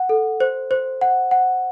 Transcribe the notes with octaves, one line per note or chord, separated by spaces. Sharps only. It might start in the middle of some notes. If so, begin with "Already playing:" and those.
Already playing: F#5
A4
C5
C5
F#5
F#5